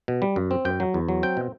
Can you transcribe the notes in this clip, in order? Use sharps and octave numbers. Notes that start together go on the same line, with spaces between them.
B2
G3
F#2
C4
F#2 G5
F#3
E2
F#3
C4 G5
B2